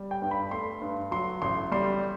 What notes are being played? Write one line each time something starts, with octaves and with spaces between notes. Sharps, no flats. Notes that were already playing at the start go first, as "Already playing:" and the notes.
Already playing: G3
G5
G2
B5
A3 C6
G2
F#3 C6
A1 C6
G3 C6